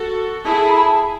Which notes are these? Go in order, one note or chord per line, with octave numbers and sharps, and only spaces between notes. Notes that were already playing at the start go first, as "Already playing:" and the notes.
Already playing: F#4 A4
E4 G#4 A5
B5
A5